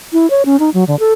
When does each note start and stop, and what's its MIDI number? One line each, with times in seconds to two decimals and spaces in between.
0.13 0.29 64
0.30 0.43 73
0.46 0.59 61
0.60 0.70 63
0.74 0.84 54
0.87 0.98 50
0.99 1.13 69